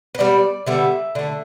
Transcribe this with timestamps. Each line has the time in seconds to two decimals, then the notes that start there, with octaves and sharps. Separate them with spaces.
0.15 B4
0.19 D3 G3 B3 D5
0.67 D3 G3 B3 E5
1.15 D3 A3